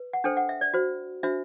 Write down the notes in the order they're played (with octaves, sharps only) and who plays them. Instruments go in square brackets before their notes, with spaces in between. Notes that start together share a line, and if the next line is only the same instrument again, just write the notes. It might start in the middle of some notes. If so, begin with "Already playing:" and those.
Already playing: [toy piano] B4
F#5
D4 A4 C5 G5
F#5
E5
D5
F#4 C5
D4 F#4 C5 E5